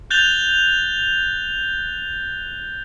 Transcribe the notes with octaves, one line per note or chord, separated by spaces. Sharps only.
F#6 G6 A6 F7 G7